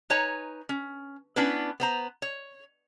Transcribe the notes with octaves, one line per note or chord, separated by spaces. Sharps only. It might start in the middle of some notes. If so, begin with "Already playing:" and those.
D#4 B4 C#5 G#5 A#5
C#4
B3 C#4 D4 E4 B4
B3 C5 A#5
C#5